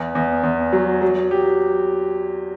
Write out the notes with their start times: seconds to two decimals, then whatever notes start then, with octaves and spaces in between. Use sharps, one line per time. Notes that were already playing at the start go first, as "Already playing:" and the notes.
Already playing: E2
0.15 E2
0.43 E2
0.73 F#3
1.02 F#3
1.31 G4